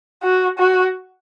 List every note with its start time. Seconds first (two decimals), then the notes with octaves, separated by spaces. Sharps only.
0.23 F#4
0.59 F#4